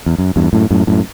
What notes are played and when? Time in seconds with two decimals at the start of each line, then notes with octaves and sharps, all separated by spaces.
0.06 E2
0.18 F#2
0.36 E2 G2
0.53 F#2 A2
0.71 F#2 A2
0.87 F#2 A2